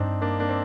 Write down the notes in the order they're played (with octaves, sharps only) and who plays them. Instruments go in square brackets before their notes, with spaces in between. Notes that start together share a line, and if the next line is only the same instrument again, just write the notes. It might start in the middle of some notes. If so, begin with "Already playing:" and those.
Already playing: [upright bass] G2 [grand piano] C4 D4 D#4
[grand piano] A#3 D4
A#3 D4
C4